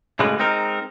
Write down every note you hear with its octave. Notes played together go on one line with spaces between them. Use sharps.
A2 C#3 G3 G#3 F#4 B4
G#3 C4 D#4 A#4